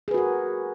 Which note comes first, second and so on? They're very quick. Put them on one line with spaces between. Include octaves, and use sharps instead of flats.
G#4 B4 F#4 A#4